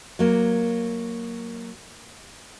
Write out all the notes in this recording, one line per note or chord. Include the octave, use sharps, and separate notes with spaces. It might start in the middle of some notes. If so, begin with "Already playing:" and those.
F#3 A#3